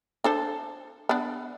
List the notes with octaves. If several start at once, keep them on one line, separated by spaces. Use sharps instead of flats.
D4 A4 C5
B3 D4